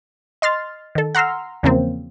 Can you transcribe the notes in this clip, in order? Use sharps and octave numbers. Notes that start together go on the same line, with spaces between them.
D#5 C6 F6 A6
D#3 A4
F#5 A#5 C6 E6 F6
E2 C#3 F3 A#3 C4